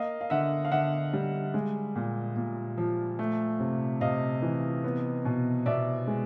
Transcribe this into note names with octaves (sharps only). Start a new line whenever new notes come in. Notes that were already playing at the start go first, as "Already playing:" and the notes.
Already playing: A#3 D#5 F5
F5
D3 E5 F#5
F5
D3 E5 F#5
G3
G#3
A#2
A#2
F3
A3
C3
C3 D#5 F5
E3
B3
B2
B2 D5 E5
G#3